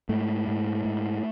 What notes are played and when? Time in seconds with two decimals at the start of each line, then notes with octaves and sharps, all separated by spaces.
0.09 G#2 A3
0.48 G#2
0.85 G#2